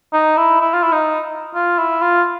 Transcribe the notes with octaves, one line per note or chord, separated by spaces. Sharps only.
D#4
E4
E4
F4
E4
D#4
F4
E4
F4